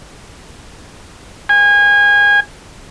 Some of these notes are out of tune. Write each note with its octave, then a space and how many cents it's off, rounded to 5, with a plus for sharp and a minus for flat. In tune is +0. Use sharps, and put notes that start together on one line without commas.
G#5 -25